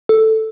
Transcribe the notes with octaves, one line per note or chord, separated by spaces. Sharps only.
A4